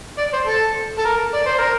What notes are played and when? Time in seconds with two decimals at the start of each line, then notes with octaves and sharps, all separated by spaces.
0.18 D5
0.33 C5
0.47 A4
0.98 A4
1.05 A#4
1.34 D5
1.46 C5
1.58 A#4